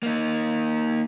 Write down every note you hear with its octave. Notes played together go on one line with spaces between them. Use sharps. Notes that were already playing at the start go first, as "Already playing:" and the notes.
A#3 D#4